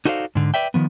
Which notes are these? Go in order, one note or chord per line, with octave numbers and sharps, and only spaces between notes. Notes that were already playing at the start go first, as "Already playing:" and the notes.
D#4 F#4 A4 C5 D5 F5
G#2 D3
B4 D5 E5 G5
D#3 F3 B3